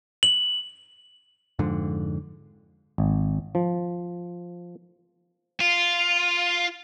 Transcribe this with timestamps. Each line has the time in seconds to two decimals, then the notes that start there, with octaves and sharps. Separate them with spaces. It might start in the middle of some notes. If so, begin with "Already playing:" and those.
0.23 F#7
1.59 F2 G#2 D3
2.98 G#1
3.55 F3
5.60 F4